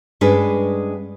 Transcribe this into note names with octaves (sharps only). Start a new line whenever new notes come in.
G2 G#3 C#4 D4 G#4 B4